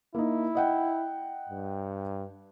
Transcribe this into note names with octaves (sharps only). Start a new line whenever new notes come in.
A#3 D#4 E4
D#5 F#5 G5
G2